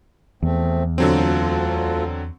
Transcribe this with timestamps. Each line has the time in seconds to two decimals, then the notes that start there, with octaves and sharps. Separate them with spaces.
0.43 E2 F3 A3 C4
0.98 D2 D3 F#3 C4 F4 A4